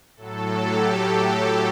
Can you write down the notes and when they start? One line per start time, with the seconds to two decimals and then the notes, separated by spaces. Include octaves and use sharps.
0.17 A2 F#3 A4
0.61 G4
1.05 A4